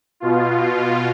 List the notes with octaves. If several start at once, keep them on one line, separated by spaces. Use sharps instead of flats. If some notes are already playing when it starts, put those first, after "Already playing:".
B2 F4